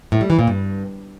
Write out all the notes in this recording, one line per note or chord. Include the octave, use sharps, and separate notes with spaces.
A2
G3
E3
A#2
G2